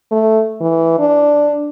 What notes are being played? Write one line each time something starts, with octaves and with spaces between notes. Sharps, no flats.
A3
E3
D4